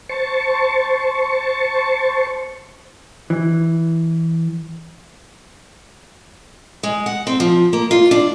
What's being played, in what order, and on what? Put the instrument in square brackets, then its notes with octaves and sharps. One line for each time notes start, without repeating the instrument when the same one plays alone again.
[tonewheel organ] C5 A5 C#6
[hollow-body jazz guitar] E3
[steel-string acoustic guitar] G#3
F#5
C4
F3
A#3
F4
D4